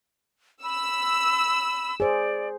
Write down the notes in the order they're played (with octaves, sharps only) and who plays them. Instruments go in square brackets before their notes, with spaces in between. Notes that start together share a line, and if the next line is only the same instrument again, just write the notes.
[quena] B5 [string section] E6
[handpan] G#4 C5 [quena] D5